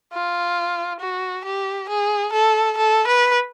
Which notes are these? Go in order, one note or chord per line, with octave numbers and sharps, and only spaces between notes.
F4
F#4
G4
G#4
A4
A4
B4